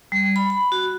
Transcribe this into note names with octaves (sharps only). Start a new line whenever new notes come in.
G3
B5
B5
F#4